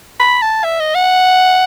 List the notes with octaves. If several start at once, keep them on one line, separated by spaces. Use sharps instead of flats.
B5
A5
E5
D#5
F#5